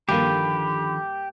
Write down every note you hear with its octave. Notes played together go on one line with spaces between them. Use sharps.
G2 D3 D#3 F3 A#3 G4 B5